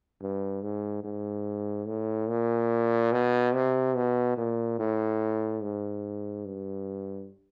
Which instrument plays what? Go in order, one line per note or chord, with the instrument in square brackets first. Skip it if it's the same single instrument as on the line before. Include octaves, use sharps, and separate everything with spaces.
[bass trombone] G2
G#2
G#2
A2
A#2
B2
C3
B2
A#2
A2
G#2
G2